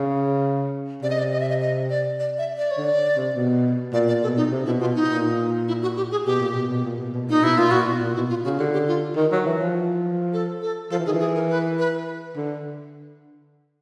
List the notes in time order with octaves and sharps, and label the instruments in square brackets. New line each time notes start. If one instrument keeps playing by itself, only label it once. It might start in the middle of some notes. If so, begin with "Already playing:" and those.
Already playing: [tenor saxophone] C#3
[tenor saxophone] C3 [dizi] D5
[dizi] D#5
D5
D#5
E5
D#5
D#5
D5
D5
E5
D5
C#5
[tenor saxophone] D3
[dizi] D5
[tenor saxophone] C3
B2
[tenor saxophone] A#2 [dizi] D5
[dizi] D5
[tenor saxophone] B2 [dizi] A4
[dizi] D#4
[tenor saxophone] C3
[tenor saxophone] B2 [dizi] E4
[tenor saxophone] B2 [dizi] F4
[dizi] D#4
[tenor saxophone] A#2
[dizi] E4
F#4
G4
G#4
[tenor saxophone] B2 [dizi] G4
[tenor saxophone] A#2
B2
B2
A#2
B2
B2
[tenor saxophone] A#2 [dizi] D#4
[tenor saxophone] B2 [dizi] E4
[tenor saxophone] A#2 [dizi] F4
[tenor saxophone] A#2 [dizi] F#4
[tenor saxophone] B2
A#2
[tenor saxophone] B2 [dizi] E4
[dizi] F4
[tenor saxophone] C#3 [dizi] F#4
[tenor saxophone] D3 [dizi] G4
[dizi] G4
F4
[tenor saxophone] D#3
F#3
E3
F3
[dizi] A4
A4
[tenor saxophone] F3 [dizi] A4
[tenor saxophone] E3
[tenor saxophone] D#3 [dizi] G#4
[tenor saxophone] E3
[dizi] G#4
A#4
B4
B4
[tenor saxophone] D3